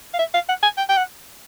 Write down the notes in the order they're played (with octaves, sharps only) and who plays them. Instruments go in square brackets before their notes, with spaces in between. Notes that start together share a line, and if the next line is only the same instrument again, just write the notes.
[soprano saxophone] F5
E5
F5
F#5
G#5
G5
G5
F#5